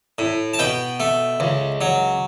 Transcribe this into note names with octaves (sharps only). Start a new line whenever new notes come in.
A2
A5
B2 G5
A3
C#2
F#3